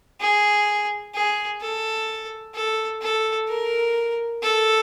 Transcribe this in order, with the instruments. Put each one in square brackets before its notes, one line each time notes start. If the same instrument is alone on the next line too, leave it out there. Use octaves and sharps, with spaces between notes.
[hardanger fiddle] G#4
G#4
A4
A4
A4
A#4
A4